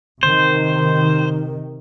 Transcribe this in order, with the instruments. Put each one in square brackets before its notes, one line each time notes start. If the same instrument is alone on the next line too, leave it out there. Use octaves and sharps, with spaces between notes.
[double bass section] C3 D#3 [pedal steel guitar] C5